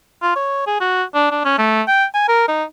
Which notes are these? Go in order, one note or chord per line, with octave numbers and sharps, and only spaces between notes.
F4
C#5
G#4
F#4
D4
D4
C#4
A3
G5
G#5
A#4
D#4